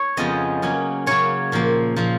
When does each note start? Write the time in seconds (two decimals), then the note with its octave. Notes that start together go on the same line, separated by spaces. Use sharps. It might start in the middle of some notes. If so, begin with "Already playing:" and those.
Already playing: C#5
0.17 F2 C#3 F3 G#3 B3 D#5
0.62 C#3 F#3 A#3 C#4
1.06 C#3 F#3 A#3 C#4 C#5
1.52 A#2 F3 A#3
1.96 A#2 F3 A#3